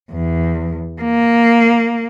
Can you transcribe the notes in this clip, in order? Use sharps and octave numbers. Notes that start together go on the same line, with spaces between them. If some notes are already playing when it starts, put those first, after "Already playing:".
E2
A#3